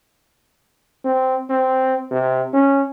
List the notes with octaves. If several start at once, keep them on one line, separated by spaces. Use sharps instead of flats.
C4
C4
C3
C#4